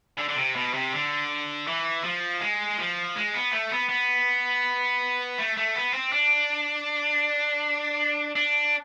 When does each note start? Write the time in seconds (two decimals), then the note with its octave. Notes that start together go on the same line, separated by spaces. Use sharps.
0.18 D3
0.29 D3
0.37 C3
0.56 B2
0.74 C3
0.93 D3
1.67 E3
2.04 F3
2.40 G#3
2.78 F3
3.16 G#3
3.34 B3
3.52 A3
3.71 B3
3.89 B3
5.38 A3
5.57 A3
5.75 B3
5.93 C4
6.12 D4
8.36 D4